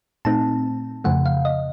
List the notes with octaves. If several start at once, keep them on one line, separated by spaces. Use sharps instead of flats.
A#2 A3 C4 D#4 A5
F2 C#3 F3 A3 F#5
F5
D#5